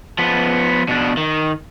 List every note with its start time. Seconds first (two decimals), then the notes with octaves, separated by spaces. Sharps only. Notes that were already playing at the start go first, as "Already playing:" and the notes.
0.18 F3 B3
0.88 B2 D4
1.17 D#3